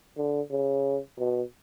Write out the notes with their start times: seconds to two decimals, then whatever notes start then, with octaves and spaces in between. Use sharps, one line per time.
0.17 D3
0.51 C#3
1.19 B2